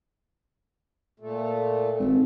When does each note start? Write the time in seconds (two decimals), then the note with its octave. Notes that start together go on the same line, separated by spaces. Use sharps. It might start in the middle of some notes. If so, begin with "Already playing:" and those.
1.20 A#2 A3
2.00 G#1